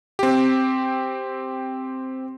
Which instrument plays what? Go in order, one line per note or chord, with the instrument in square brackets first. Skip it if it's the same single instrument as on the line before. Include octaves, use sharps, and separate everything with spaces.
[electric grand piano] C4 G4